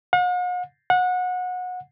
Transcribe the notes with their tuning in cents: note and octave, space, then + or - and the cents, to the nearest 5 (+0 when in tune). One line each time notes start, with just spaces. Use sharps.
F#5 -45
F#5 -25